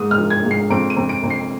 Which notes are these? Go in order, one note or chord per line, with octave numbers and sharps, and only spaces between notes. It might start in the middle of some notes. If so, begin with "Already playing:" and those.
Already playing: G#2 D#6
F6
F3
G#6
G#2
C7
F2 D7
D#7
F2
D7
F2
C7